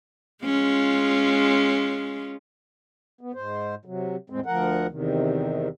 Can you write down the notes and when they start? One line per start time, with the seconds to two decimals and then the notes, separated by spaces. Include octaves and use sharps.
0.44 G#3 C#4 F4
3.21 B3
3.34 G#2 C5
3.85 C3 F#3
4.30 E2 A2 G#3 C4
4.46 D2 F3 A#4 F#5
4.90 E2 C3 D#3